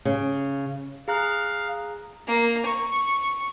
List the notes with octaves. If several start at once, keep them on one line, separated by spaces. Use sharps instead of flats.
C#3
G#4 F5 A#5 F#6
A#3
C#6